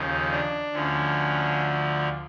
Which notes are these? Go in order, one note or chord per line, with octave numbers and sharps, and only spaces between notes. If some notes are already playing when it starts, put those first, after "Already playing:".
Already playing: D#2 C#3 F3 D#4
D4
D2 D3 F3 C#4